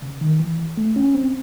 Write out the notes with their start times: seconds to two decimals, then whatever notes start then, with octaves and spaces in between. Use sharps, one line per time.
0.02 C#3
0.21 D#3
0.40 E3
0.77 A3
0.96 C#4
1.14 C4